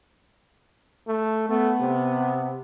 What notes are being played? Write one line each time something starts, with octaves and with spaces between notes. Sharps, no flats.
A3
A3 B3
C3